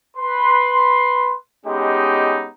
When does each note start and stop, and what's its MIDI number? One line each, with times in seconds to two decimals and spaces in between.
0.17 1.34 71
0.17 1.34 84
1.66 2.48 56
1.66 2.48 59
1.66 2.48 61
1.66 2.48 63
1.66 2.48 67